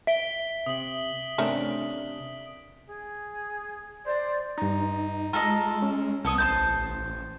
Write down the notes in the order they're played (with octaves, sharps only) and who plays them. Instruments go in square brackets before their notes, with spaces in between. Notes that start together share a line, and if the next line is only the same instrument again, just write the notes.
[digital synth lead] E5 [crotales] B6 D7 G7
[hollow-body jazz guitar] C3 [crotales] D#6 F#7
[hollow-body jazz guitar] C3 D4 [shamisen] A3 C#4 A#4
[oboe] G#4
[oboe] C5 [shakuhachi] D5
[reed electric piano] G2 A#5 [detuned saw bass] D#4
[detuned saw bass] G#3 [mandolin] F4 A4 D#5 [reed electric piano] A#5
[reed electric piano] C#4
[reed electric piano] C2 [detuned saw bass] B3 [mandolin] A4 C#5 D#6
[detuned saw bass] A1 [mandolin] C5 A5 G6